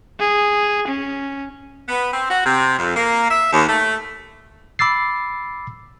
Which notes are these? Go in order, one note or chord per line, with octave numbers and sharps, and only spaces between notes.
G#4
C#4
B3
C4
F#4
C3
F2
A#3
E5
D#2
A3
B5 D6 E6 A6 C7